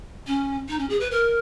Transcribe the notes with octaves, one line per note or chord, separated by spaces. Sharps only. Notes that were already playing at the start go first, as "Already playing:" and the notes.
C#4
D#4
C#4
G#4
B4
A#4